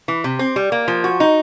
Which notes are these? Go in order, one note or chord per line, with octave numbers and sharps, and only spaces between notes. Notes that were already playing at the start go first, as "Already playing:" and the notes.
E3
C3
C4
G3
A#3
F3
F#4
D#4